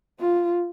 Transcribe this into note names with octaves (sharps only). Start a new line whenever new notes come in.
F4